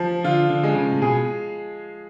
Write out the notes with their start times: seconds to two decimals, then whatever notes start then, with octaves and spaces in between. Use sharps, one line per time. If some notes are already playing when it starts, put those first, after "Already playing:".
Already playing: F3
0.24 D3 F4
0.50 D3
0.63 G#3
0.75 C#3
0.92 A2
1.02 B2 G#4